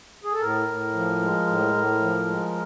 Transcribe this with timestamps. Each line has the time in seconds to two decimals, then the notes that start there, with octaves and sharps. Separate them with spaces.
0.24 G#4
0.33 A4
0.41 A2 A#4
0.68 A2
0.94 F3
1.21 G#3
1.47 A2
1.74 A2
2.00 F3
2.26 G#3